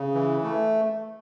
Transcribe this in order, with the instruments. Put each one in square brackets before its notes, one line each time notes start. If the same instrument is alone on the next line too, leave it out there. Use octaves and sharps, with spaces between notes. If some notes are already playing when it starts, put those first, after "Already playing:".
Already playing: [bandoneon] C#3
E3
A3